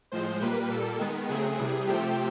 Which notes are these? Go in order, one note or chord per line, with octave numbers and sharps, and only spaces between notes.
A2 F3 G#3 C5
A#2 G3 A#3 B4
A#2 G3 A#3 A4
D#3 G#3 B3
C#3 F#3 A3 C4 G#4
C3 E3 G3
C3 F3 A3 C4 G4